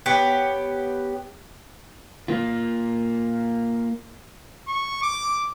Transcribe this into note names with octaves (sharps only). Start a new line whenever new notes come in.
B3 G4 C#5
A#3 F4
C#6
D6